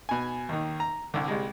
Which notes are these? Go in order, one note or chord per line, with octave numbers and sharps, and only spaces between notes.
B2 G#5
D#2 D#3
A#5
C2 D3
C2 G3 G#3